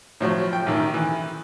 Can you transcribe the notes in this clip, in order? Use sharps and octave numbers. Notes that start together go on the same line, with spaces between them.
A2 F3 F#3
G5
A1 D#3
E3